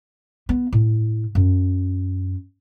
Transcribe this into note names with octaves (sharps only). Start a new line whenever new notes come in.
B3
A2
F#2